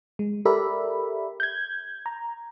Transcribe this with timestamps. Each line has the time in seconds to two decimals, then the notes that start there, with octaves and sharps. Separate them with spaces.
0.19 G#3
0.45 G4 A4 A#4 D5 E5 B5
1.40 G6 G#6
2.06 A#5